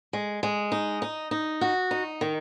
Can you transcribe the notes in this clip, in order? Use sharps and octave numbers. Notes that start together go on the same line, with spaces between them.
G#3
G#3
D#4
D#4
D#4
F#4
D#4
D#3